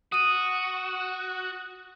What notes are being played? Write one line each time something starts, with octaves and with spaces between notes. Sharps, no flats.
F#4 D#6 D#7